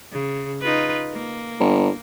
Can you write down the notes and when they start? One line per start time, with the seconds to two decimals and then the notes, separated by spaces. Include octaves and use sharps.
0.12 C#3
0.61 D#4 F4 B4
1.12 A#3
1.60 G1